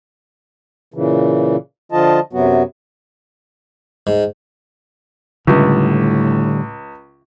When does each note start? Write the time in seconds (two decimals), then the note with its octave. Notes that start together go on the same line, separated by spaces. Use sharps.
0.94 A#2 C#3 E3
1.92 D3 F3 F4 D#5 A5
2.33 F#2 C3 F#3 B3 F#4
4.07 G#2
5.47 C#2 A2 D3 G3